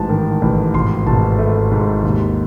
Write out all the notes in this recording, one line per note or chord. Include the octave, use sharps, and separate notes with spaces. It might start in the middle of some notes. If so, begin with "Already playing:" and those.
Already playing: A1 G#2 A5
D#3
A1
G#1 C6
G#1 A5
A3
G#2
D#2